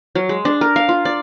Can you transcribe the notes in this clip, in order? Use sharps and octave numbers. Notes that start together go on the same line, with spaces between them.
F#3
G#3
D4
A#4
F5
F4
D5